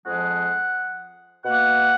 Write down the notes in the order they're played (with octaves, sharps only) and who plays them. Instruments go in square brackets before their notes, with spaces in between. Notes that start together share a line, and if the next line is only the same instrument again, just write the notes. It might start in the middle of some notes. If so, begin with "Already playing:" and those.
[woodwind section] F2 F3 G#3 F#5
B2 A#3 F#5